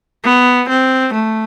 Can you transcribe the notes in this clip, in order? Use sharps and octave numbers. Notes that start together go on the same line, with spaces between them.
B3
C4
A3